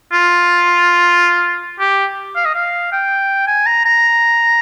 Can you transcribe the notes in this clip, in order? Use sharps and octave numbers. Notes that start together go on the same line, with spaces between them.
F4
G4
F5
D#5
F5
G5
G#5
A#5
A#5